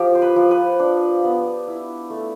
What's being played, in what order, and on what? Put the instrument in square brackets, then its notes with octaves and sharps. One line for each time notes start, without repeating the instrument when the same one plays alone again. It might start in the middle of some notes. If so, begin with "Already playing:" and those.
Already playing: [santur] F3 G4
C5
B4
F3
B4
D4
B3
E4
A3